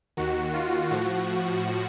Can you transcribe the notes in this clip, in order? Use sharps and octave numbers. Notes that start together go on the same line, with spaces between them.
D#2 D#3 F#4
F4
A2 F3 F#4